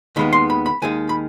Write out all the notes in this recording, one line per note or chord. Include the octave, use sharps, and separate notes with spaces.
D#2 D#3 G#3 B3 B5
C6
B5
B5
D#2 D#3 G#3 G#5
B5